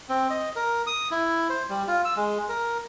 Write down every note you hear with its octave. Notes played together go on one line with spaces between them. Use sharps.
C4
D#5
A#4
D#6
E4
C5
G3
F4
E6
G#3
A#4